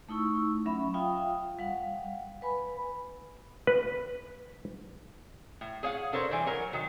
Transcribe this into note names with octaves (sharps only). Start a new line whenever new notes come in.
A3 D#4 E4 C#6 E6
F#3 C#4 E5 B5
F4 E5 F5 G5 D#6
G3 F5 F#5
B4 G#5 B5
B4
A2
G#4 C#5 F5 F#5
D4 A4 A#4 C5 C#5
E3 G3 C5
F#3 A#4 C#5
D#3 F#3